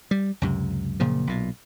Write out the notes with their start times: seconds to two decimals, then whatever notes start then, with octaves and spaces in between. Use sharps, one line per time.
0.11 G3
0.42 C#2 F#2 C3
1.00 F#1 A#2 C#3 F3
1.27 B1 A#2